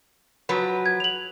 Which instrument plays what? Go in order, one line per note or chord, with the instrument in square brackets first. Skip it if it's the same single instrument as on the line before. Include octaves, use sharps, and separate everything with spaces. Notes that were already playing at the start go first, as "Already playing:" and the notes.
[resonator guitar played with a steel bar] F3 F#3 B4
[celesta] G#6
F7 F#7